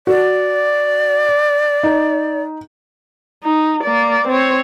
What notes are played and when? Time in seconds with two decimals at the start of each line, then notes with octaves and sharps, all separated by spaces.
0.07 F#4 D5
1.83 D#4
3.44 D#4
3.83 A#3 D5
4.28 C4 C#5